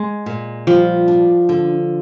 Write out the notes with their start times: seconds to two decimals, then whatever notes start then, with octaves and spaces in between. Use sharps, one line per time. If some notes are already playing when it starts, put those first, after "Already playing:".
Already playing: G#3
0.26 A#2
0.67 F3 G3
1.08 D4
1.49 D3